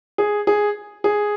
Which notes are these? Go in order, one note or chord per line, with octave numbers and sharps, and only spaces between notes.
G#4
G#4
G#4